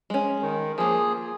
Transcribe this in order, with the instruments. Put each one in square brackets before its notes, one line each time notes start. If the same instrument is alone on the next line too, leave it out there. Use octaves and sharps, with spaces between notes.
[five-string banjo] G#3 C#4
[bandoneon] D#3
[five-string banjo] F3 A#3 [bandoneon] G#4